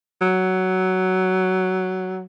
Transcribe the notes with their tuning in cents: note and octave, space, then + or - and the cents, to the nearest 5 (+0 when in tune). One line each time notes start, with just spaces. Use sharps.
F#3 +10